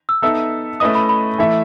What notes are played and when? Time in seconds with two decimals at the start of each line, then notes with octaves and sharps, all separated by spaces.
0.09 E6
0.22 B3 D#4 A4 E5 E6
0.80 A3 C#4 E4 B4 D#5 D#6
0.95 B5
1.09 B5
1.38 E3 A3 E4 A4 E5